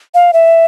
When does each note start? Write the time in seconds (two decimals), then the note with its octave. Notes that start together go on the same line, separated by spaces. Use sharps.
0.14 F5
0.33 E5